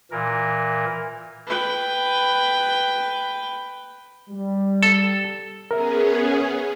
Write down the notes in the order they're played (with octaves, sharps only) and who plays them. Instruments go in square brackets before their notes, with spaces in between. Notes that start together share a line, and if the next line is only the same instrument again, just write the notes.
[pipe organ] A#2 E3 A#4
[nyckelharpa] B4 G5
[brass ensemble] G3
[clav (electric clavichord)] A4
[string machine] B3 C#4 G#4 [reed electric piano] A#4 E5